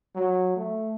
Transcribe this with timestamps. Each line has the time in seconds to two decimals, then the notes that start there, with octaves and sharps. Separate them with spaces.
0.15 F#3
0.57 A3